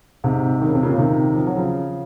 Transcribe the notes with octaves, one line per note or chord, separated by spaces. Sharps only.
G#2 C3
D#3
C#3
C3
A#2 C#3
C#3
C3 D#3
F3
F#3
C#3 F3